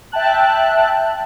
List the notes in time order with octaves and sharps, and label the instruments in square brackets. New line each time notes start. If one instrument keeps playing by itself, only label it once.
[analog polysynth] E5 G5 A5 F#6